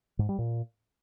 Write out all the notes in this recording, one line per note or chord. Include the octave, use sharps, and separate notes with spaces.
G#2
G3
A#2